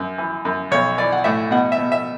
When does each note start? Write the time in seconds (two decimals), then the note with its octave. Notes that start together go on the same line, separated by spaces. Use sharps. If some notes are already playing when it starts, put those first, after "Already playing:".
Already playing: F#2
0.18 E3
0.45 F#2
0.71 B1 C#5
0.98 E3 D5
1.12 F#5
1.24 A2 E5
1.51 B2 F#5
1.72 E5
1.78 B2
1.92 E5